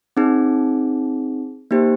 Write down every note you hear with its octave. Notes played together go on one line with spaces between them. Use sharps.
C4 D#4 G#4
A#3 D#4 G4 C5